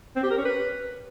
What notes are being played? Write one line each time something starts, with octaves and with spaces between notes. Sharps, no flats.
C4
G4
A#4
C#4
B4